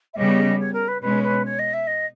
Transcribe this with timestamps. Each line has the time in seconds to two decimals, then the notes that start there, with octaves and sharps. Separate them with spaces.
0.14 E5
0.17 C#3 G3 B3 D#5
0.60 C#5
0.73 A#4
0.88 B4
1.02 B2 G#3 C#4 B4
1.23 B4
1.45 C#5
1.59 D#5
1.74 E5
1.87 D#5